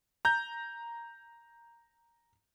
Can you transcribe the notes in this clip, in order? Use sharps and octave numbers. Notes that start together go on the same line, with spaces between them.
A#5 G6